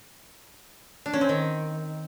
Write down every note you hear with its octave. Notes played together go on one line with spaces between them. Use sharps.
D4
C#4
C4
D#3